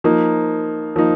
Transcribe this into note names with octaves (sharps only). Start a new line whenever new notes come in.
F3 A#3 D#4
F3 A#3 D#4